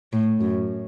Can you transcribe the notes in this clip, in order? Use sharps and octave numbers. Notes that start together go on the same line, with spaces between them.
A2
F#2